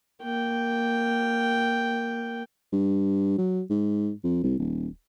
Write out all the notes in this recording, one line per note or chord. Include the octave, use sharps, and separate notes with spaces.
A#3 G5
G2
F#3
G#2
F2
C2
D#1